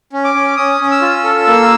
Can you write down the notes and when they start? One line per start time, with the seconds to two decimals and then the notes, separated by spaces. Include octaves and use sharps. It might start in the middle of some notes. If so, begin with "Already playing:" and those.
0.13 C#4
0.24 D6
0.35 C#4
0.57 C#4 D#6
0.80 C#4
0.91 E6
1.01 F4
1.24 A4
1.47 A#3